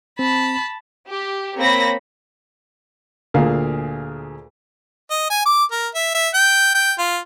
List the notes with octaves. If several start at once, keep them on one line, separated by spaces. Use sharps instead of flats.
C4 A5 B5
G4
A#3 C4 C#5 B5 A#6
D2 A#2 G#4 A#4 F5
D#5
G#5
D6
A#4
E5
E5
G5
G5
F4